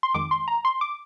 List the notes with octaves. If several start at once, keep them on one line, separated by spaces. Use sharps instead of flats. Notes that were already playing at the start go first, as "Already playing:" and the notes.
C6
F2 D#3 G#3 D6
C6
A#5
C6
D6